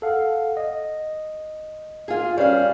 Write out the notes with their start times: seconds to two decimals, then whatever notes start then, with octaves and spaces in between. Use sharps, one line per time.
0.02 A4 F5 F#5
0.57 D#5
2.08 F4 G#4
2.38 G3 C#4 B4 C#5 F5